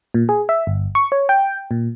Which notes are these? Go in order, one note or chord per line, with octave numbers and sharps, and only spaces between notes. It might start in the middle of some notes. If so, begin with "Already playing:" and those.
A#2
G#4
E5
G1
C#6
C#5
G5
A#2